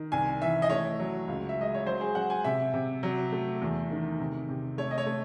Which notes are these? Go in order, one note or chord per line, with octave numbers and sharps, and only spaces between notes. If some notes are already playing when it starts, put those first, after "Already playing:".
Already playing: D#3
C2 G#5
E3 E5
D#5
A3 C#5
F#3
C#2
E5
G#3 D#5
C#5
F#3 C5
G#4
F#3 F#5
G#5
C3 E5
C3
F#3
A3
E2
D#3
C3
C3
A3 C#5
D#5
C#5
A3